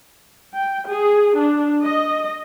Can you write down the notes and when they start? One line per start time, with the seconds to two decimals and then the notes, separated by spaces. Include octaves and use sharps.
0.54 G5
0.88 G#4
1.36 D4
1.83 D#5